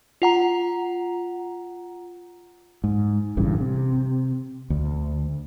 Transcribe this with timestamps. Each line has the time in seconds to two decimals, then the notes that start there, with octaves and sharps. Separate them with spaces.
0.22 F4 F#5 A#5
2.84 G#2
3.37 A1 G2 C#3 E3
3.61 C3
4.70 D2